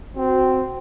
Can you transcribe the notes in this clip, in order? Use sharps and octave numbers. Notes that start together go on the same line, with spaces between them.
C4 F#4